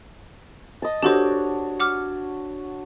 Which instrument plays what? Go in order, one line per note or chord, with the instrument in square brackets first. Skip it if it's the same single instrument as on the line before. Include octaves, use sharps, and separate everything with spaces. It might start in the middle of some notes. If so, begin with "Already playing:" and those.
[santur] D#5 A5
[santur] D4 F#4 C#5 [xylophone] G4 A4 C5
[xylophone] F#5 D6 F6